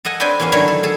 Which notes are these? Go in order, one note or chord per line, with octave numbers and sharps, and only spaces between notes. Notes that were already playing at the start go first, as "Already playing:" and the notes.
A4 D#5 F#5 G#5
C4 D4 B4 C#5 G5 G#5
E2 A#3 B3 C#4 F5
D3 D#3 F#3 A3 E4 C#5
A4
G#4 A4